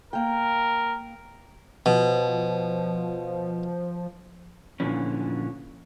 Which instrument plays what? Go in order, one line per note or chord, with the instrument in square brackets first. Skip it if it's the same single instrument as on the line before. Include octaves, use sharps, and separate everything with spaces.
[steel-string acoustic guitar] A#3 G5 [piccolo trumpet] A#4
[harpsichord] B2 [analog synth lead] F3
[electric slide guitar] A#2 D3 E3 F3 C#4